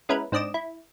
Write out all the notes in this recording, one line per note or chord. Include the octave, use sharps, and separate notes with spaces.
G#3 B3 C#4 E4 A#4 B4
G#2 C4 D4 D#5 D6 E7
E4